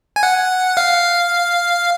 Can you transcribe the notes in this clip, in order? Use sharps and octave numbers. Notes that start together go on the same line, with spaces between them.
G#5
F#5
F5